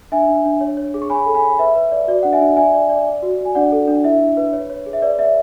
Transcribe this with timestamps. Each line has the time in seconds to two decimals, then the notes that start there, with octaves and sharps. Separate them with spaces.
0.12 D4 E5 G#5
0.29 D4
0.45 D4
0.61 C#5
0.77 C#5
0.94 G#4
1.02 C#6
1.10 C#5 G#5 B5
1.26 A4
1.34 G#5 B5
1.43 C#5
1.59 B4 E5
1.75 B4
1.91 D5
2.08 F#4 D5
2.23 D4 F#5
2.33 E5 G#5
2.41 D4
2.57 D5 E5 G#5
2.74 D5
2.90 D5
3.06 D5
3.23 F#4
3.38 F#4
3.45 G#5
3.55 D4 D5 F#5
3.72 A4
3.88 D4
4.04 E4 E5
4.20 E4
4.37 B4
4.53 C#5
4.70 C#5
4.86 G#4
4.93 E5
5.02 B4 D5
5.19 D5 E5